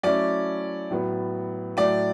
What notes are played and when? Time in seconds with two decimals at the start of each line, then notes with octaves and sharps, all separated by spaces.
0.03 F#3 A3 C#4 E4 D5 D6
0.90 A2 F#3 B3
1.77 A2 F#3 A3 D5 D6